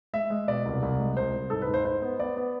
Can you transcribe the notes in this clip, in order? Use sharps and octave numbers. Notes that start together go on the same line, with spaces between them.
G#3 E5
G#3
B2 D5
C2
C2
G#3
C2 C5
C2
G#2 A4
B4
G#2
C5
G#2 C5
B3
B3 D5
B3